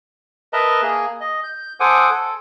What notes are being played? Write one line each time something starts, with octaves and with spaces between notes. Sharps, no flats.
A#4 B4 D#5 E5 A5 A#5
A#3 G#4
D#5
G6
A4 C5 F#5 G#5 D6 D#6
A4